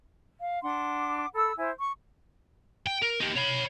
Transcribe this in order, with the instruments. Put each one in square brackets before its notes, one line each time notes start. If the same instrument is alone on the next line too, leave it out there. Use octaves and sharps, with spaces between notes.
[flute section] F5
D4 F#5 C6 D6
A4 B5 E6
E4 C5 G#5
C#6
[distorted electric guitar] G5
A#4
D#4 G4
C#5 B5